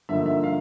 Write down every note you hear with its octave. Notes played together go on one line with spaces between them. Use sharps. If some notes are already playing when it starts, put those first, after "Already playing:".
G2 D3 F3 A#3 D#4 E5
E5
F5